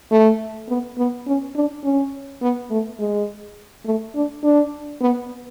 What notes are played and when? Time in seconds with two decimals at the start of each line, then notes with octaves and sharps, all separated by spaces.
0.11 A3
0.69 B3
0.98 B3
1.27 C#4
1.55 D4
1.84 C#4
2.42 B3
2.71 A3
2.99 G#3
3.85 A3
4.15 D4
4.43 D4
5.01 B3